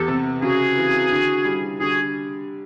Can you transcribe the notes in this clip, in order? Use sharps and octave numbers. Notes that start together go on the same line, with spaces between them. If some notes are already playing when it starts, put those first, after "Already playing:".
Already playing: E2 G4 A4
C3
C#3 F#4 G#4
E3
D3
G3
D3 F#4 G#4